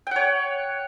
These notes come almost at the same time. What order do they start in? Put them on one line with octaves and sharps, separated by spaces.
G5 F#5 C#5